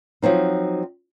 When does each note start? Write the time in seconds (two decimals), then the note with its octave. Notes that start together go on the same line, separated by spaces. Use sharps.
0.22 F3 F#3 C4 D#4